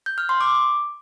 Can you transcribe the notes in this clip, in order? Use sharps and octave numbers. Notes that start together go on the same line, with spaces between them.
G6
F6
C6
D6